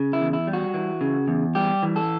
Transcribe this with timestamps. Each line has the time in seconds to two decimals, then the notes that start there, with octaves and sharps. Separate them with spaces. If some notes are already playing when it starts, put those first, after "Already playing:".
Already playing: C#3
0.13 E4
0.20 E2
0.33 E4
0.47 G3
0.53 F#4
0.74 E3
1.01 C#3
1.28 E2
1.55 G3 G4
1.83 E3
1.96 A4